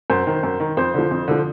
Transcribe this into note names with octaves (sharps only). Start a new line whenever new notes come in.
F#2 C5
D#3
F#2
D#3
F2 C5
D3 F3
F2
D3 F3